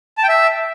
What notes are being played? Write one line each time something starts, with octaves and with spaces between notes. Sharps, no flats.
A5
G5
E5